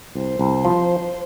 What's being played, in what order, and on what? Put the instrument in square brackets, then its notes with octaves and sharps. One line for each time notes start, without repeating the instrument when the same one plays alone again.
[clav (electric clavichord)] C2 [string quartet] C5
[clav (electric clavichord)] C2
F3